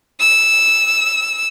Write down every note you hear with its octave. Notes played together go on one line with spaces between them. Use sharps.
E6